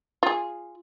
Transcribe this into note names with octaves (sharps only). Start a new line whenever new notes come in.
F4 G#4